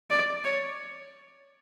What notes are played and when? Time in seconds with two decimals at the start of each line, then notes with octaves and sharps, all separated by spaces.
0.10 D5
0.44 C#5